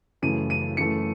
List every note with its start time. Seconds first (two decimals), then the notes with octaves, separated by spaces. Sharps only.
0.22 F#2 C#3 E3 A3 D#7
0.50 D#7
0.77 F#2 E3 A3 C#7